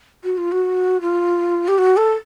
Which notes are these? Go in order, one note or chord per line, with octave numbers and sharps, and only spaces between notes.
F#4
F4
F#4
F4
G4
F#4
A4